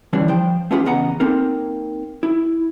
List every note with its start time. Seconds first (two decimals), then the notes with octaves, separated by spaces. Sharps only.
0.13 D3 E3 G3 C#4 D4
0.28 F3 C5 G5
0.71 A3 B3 C#4 F4 G4 G#4
0.85 E2 C#3 B3 D#5 F#5 A#5
1.20 A#3 C4 D#4 A4 A#4
2.23 E4